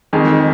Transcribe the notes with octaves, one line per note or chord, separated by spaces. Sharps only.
F2 D#3 G#3